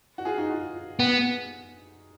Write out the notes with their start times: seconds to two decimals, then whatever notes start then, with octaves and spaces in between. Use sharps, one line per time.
0.18 F#4
0.25 F4 G#4
0.38 D#4 F#4
0.51 F4
1.00 B3